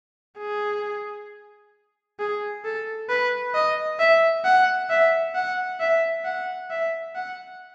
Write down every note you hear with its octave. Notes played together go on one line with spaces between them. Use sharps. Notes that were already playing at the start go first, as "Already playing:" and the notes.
G#4
G#4
A4
B4
D#5
E5
F#5
E5
F#5
E5
F#5
E5
F#5